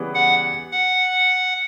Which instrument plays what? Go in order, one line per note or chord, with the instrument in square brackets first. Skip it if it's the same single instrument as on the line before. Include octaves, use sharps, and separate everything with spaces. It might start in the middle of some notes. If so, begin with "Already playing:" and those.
Already playing: [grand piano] C#3 E3 G3 B3
[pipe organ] F#5
F#5